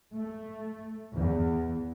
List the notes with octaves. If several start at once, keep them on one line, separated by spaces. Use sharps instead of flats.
A3
E2